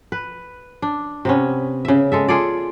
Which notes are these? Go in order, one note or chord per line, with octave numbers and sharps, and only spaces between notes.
B4
D4
C3 B3 C#4
C#3 E5
G#3 A4 E5
F4 G#4 A4 D5